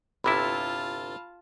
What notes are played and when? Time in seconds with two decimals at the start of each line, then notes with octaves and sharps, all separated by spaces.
0.24 G1 C3 E4 F4 A5 B5